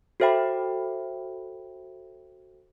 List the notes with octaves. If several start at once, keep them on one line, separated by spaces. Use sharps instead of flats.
F#4 A4 C5 E5 G5 B5